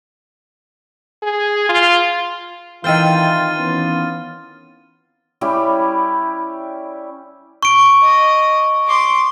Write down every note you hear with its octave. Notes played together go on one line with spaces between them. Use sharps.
G#4
F4
D#3 E3 C4 F4 C5 F6 A6 D#7
E3 B3 C#4
G3 C#4 E4 G4
C#6 D7
D#5
C6 D6